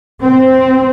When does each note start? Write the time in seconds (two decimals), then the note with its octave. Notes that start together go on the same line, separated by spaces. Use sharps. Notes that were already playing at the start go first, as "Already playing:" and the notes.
0.21 C4